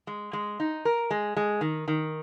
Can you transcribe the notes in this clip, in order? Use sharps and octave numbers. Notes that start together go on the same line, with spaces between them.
G#3
G#3
D#4
A#4
G#3
G#3
D#3
D#3